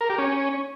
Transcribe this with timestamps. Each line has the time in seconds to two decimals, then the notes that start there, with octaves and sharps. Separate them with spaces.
0.01 A#4
0.09 G4
0.18 C#4